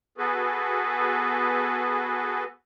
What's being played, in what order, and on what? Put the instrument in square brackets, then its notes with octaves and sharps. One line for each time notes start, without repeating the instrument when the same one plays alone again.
[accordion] B3 F#4 G#4 A4 B4